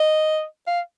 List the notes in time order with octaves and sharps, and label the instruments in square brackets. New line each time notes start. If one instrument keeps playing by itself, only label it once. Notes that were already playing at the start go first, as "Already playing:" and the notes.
Already playing: [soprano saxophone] D#5
F5